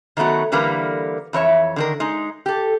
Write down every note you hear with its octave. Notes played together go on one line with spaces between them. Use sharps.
D#3 F#3 A3 B3 F#4
D3 E3 G3 A#3 A#4 B4
F2 E3 C#5 E5
D3 D#3 A#4
G#3 D#4
G4 A4